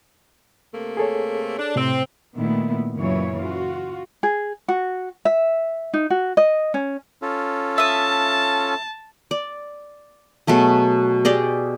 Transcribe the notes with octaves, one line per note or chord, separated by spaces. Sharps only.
C3 A3 A#3
G#4 A4 C#5
D4
A2 C3 C4
A#2 D#3 A3 B3 E4
F#2 A#2 C#3 E3 F#3 C#5
F4 F#4
G#4
F#4
E5
D#4
F#4
D#5
C#4
C#4 F4 A4
E5 A5 D#6
D5
B2 F#3 A3 G#4
G4 G#4 D5 D#5